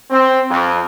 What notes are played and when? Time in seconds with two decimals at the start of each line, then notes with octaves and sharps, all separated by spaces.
0.11 C4
0.50 F2